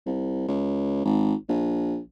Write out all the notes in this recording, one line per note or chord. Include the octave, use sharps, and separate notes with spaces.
C2
C#2
G#1
A#1